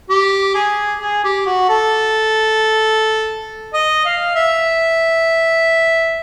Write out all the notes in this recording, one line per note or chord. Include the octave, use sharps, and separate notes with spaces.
G4
G#4
G#4
G4
F#4
A4
D#5
F5
E5